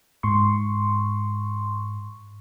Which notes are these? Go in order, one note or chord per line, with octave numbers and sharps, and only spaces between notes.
G#2 C6 C#6